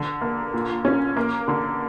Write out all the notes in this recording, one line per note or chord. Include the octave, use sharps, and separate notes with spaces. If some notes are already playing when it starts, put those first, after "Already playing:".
Already playing: D3
A#3
A#2
C#4
A#3
D3